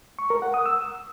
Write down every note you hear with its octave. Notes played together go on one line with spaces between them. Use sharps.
C#6
A#4
F#5
D#6
E6